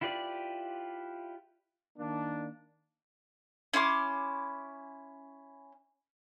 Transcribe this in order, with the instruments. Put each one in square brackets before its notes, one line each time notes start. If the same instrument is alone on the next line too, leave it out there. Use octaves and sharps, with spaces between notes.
[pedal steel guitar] E4 F4 G4 B4 D5
[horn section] D#3 A#3 D4
[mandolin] C#4 E4 C6 D6